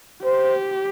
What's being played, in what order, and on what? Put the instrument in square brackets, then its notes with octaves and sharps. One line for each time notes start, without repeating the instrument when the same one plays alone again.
[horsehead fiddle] G4 [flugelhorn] C5